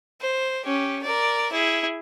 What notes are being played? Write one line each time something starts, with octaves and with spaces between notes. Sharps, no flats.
C5
C#4 G4
A#4 D5
E4 G#4